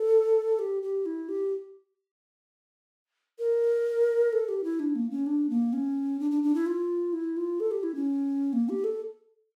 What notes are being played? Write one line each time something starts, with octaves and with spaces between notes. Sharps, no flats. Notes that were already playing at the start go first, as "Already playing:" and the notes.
Already playing: A4
G4
G4
E4
G4
A#4
A4
G4
E4
D4
A#3
C#4
D4
A#3
C#4
D4
D4
D4
E4
F4
E4
F4
A4
G4
E4
C#4
A#3
G4
A4